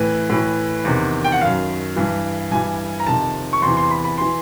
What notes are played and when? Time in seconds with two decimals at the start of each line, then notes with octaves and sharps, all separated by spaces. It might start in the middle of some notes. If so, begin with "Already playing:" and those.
Already playing: A2 E3 B4
0.30 A2 E3
0.85 E2 C3 D#3
1.25 G5
1.32 F#5
1.41 F#2 D#3 F5
1.96 G2 E3
2.51 G2 E3 G#5
3.00 A#5
3.07 F2 C3 D#3 A5
3.53 C#6
3.62 E2 C3 E3 C6
3.77 C6
3.91 B5
4.04 B5
4.18 E3 C6